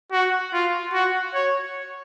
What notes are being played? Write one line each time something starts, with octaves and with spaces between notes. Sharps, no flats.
F#4
F4
F#4
C#5